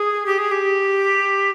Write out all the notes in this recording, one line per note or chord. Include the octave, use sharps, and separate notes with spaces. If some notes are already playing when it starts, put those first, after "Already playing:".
Already playing: G#4
G4
G#4
G4